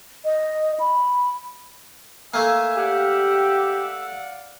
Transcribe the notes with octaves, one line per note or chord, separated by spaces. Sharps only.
D#5
B5
A3 A#3 E5 G#5
G4 D5 F5 F#5